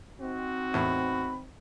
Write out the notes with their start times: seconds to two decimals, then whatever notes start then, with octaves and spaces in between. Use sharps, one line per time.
0.21 C4 D#4 F#4
0.74 E2 A2 B5